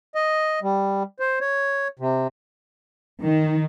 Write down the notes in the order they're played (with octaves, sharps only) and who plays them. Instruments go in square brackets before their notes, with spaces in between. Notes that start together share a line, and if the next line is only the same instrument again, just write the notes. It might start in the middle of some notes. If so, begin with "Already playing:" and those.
[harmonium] D#5
G3
C5
C#5
C3
[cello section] D#3